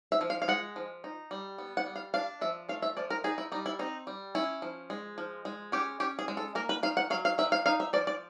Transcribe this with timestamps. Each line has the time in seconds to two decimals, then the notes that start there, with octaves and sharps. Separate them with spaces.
0.12 E5
0.21 F3
0.30 F5
0.42 F5
0.48 G#3 F#5
0.76 F3
1.04 D#4
1.31 G3
1.58 B3
1.77 F#5
1.86 G3
1.96 F5
2.14 D4 F5
2.41 F3 E5
2.69 A3 F5
2.82 E5
2.97 F3 D5
3.10 A#4
3.24 D#4 G#4
3.38 E4
3.52 G3 D#4
3.66 E4
3.79 C4 D#4
4.07 G3
4.35 C#4 E4
4.62 F3
4.90 G#3
5.18 F3
5.45 G#3
5.72 C#4 G4
6.00 C#4 G4
6.19 G#4
6.28 G#3
6.37 A4
6.55 A#3 A#4
6.69 B4
6.83 D#3 F5
6.97 F#5
7.10 F#3 F5
7.25 F5
7.38 D#3 E5
7.52 F5
7.66 D#4 F5
7.80 E5
7.93 F3 D5
8.07 D5